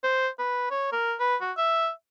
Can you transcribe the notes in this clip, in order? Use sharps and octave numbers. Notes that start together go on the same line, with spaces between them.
C5
B4
C#5
A#4
B4
F#4
E5